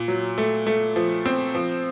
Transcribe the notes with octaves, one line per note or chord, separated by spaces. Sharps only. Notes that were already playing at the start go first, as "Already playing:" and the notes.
Already playing: A#2
F#3
A3
A3
F3
C4
F3